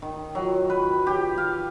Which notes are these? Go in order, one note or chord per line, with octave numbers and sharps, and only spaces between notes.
D#3
F#3
B4
G4
F5